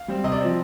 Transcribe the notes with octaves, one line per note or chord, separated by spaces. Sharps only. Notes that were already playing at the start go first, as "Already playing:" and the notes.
Already playing: F5
G3 C4
C3 D#5
D5
F3 C4